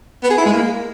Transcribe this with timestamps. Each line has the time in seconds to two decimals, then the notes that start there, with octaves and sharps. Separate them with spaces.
0.23 B3
0.31 G#4
0.38 E4
0.46 G#3
0.53 A#3